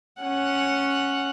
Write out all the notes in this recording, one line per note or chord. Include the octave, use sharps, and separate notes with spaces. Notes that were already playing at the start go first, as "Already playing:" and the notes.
C#4 F#5